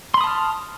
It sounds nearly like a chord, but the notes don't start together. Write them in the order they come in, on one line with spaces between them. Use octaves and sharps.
C6 B5 D#6 A5 F6